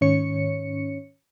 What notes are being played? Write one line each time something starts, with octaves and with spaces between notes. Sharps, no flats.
G#2 D#3 C#4 C#5 C#7